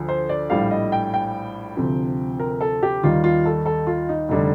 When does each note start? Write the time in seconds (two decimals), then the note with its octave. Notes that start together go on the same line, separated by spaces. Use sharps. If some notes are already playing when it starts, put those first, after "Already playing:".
Already playing: D2 D3 F3
0.08 C5
0.29 D5
0.50 A#1 A2 G3 F5
0.71 D#5
0.92 G5
1.14 G5
1.77 D2 C3 F3
2.39 A#4
2.61 A4
2.83 G4
3.03 D#2 D#3 G3 F4
3.24 F4
3.46 A4
3.66 A4
3.87 F4
4.09 D#4
4.29 F1 D3 G3